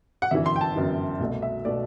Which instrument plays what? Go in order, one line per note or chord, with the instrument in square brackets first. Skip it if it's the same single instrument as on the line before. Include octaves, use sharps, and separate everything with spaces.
[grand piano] F#5
G1 F#2 E3 E5
C6
G5
A5
G1 F#2 E3
C2 B2 A3
E5
B2 A3 D5